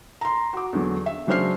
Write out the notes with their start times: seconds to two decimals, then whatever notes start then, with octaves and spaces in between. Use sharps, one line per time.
0.21 A#5 C6
0.53 F#4 D6
0.73 E2 D3 F#3
1.06 E5
1.27 C#3 F#3 D4 C5 F6 C7